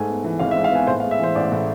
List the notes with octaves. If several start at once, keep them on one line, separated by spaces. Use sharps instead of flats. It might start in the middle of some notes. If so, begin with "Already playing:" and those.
Already playing: G#2 A3 G#5
B3
E3
G#1 F5
E5
G#2
F5
B3 G#5
A2 C5
F5
G#3
E5
E3 C5
A1 D5
A2